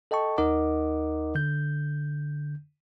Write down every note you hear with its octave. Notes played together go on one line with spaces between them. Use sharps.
A4 D#5 G5 A5 C#6
D#2 D#4 A#4 D#5 F#5 D6
D3 G6